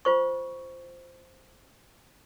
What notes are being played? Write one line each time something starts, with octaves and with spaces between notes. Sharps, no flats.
F4 C5 C#6